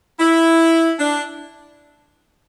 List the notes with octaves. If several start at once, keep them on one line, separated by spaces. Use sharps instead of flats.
E4
D4